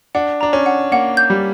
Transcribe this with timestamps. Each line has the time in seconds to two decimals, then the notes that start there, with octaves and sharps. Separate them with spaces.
0.15 D4 F#5
0.41 D4 A#5
0.53 C#4
0.66 F#5
0.92 A#3 F#5
1.17 G6
1.30 G3